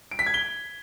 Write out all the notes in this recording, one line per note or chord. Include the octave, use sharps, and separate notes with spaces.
D7
B6
G#6
G7